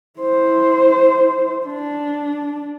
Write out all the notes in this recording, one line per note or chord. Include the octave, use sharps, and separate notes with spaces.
E4 C5
D4